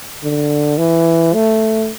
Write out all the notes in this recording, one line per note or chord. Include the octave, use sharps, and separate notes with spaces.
D3
E3
A3